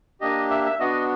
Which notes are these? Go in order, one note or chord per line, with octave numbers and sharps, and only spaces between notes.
A#3 D4 G4 D#5
E5
E5
B3 D4 F#4 D#5